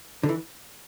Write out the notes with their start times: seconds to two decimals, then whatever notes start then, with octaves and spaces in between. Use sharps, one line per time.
0.23 D3
0.29 E3